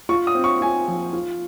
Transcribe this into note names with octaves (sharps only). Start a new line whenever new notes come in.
F4 C#6
D#6
C4
C#6
F4 G#5
F3
F4